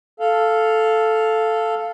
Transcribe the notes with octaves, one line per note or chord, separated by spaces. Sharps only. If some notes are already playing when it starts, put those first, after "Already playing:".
A4 F5